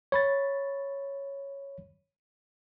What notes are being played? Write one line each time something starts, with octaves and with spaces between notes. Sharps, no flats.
C#5 B5 A6